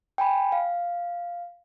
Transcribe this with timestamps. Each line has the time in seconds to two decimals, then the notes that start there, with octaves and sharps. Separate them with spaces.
0.18 G5 G#5 B5
0.52 F5